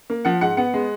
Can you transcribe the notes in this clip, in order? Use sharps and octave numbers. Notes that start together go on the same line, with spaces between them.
A#3
F3 F#5
G#2 F#5
B3 F#5
G#3